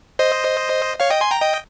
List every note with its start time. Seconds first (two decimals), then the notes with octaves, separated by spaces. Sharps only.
0.19 C5 D#5
1.00 C#5 F5
1.10 D#5 G5
1.21 G#5 C6
1.31 G5 A#5
1.41 D#5 G5